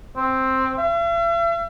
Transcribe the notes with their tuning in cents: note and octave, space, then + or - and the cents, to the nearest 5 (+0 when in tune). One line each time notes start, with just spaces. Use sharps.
C4 +5
E5 +45